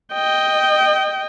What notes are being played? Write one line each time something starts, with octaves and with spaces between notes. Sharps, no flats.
D#5 G5